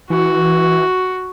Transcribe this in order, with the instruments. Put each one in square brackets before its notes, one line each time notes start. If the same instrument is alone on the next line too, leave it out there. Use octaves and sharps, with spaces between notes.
[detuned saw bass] E3 [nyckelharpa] F#4